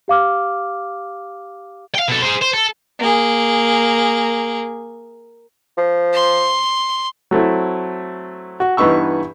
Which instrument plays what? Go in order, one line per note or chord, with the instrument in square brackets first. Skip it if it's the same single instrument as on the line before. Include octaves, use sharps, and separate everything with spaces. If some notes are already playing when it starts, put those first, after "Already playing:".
[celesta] G4 F5 D6 F6
[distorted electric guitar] F5 G5
B2 A4
G#4 C5
C5
A4
[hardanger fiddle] A#3 G#4
[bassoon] F3
[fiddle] C6
[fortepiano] F#3 A3 C4 E4
F#4
G2 E3 B3 D#4 C#6 E6